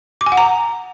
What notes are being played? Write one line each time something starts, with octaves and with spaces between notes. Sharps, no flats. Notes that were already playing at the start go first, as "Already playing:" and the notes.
D6
G#5
F#5
A#5